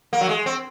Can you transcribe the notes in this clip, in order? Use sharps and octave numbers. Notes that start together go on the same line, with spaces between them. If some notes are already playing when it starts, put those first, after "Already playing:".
A#3
F#3
G#3
C4